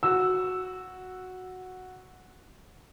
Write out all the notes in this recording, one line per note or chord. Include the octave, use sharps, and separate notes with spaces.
F#4 E6